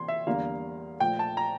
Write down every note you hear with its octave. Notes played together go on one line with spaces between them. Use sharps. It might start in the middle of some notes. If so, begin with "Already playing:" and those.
Already playing: C3 E3 A#3 C6
E5
E2 D3 G3 A#3 F5
A#2 F3 A3 G5
A5
A#5